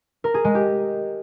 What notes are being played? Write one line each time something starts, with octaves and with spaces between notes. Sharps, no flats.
A#4
G#4
G#3
G4